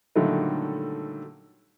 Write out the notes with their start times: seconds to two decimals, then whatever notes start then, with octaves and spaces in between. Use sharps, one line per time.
0.16 A#2 D3 D#3 F#3 G3 A3